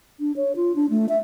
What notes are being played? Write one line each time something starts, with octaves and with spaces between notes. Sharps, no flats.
D4
C#5
F4
D4
A3
E5